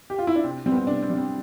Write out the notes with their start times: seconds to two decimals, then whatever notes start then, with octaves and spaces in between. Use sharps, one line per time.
0.10 G4
0.19 F4
0.27 E4
0.36 D4
0.44 C3 C4
0.66 G3 C4
0.71 B3
0.77 C4
0.87 C3 D4
1.02 C4
1.10 G3
1.17 C4